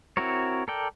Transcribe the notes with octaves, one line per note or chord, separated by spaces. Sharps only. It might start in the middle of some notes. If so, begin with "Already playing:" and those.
C4 E4 F#4 A#4 C#5
A4 A#4 D5 G5